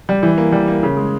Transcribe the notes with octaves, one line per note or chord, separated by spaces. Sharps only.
G3
E3
A#3
G3
A#3
C#3
G#3